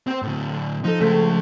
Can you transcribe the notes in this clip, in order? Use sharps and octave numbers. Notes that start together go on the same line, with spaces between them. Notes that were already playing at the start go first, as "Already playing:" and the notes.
C4 C5
A2 D3
F3 D#4 A4
C#3 G#3 A3 C4